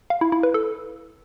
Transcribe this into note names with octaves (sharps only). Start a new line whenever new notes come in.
F5
E4
E4
B4
A4